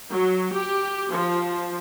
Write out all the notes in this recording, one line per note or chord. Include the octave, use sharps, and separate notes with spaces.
F#3
G4
F3